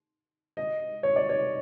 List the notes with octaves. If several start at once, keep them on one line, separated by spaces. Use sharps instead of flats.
D#5
C#5
D5
C#5